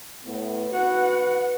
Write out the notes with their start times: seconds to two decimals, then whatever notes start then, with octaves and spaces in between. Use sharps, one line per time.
0.25 A2 B3
0.71 F#4 B4 F#5